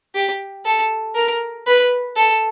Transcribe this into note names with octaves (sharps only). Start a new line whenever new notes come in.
G4
A4
A#4
B4
A4